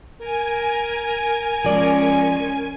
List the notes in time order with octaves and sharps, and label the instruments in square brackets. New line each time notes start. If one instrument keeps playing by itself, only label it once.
[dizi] A#4 [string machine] G#5
[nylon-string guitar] F3 D5 [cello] G#3 C#4